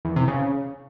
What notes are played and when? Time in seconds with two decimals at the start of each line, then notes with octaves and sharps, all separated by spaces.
0.05 E2
0.16 C3
0.28 C#3